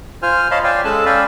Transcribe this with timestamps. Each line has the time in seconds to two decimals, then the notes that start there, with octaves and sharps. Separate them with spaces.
0.22 F4 C5 G#5 F6
0.51 C#5 D#5 F5 A5 B5 C6
0.64 D5 F5 G5 G#5
0.85 G#3 C#4 A4 A5 E6 F#6
1.06 C#4 D5 F5 G5 G#5 B5